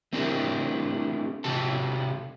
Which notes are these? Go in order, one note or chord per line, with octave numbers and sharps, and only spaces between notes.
A3 C4 D4 E4 G4 A#4
C3 F#4 G4 A4 A5